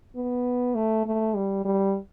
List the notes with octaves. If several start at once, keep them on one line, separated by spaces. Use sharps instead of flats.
B3
A3
A3
G3
G3